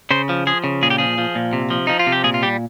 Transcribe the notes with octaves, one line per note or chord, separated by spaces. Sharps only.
C#3 C5
F3
F3 G#4
C#3
A#2 G#4
G4
F3 G#4
F3
A#2
C3
F3
F3 D#4
F4
C3
G4
A#2 G#4
F4
G3 G4